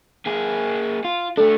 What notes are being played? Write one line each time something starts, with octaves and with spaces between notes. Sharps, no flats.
A#3 G#4
F4
A3 D4 A4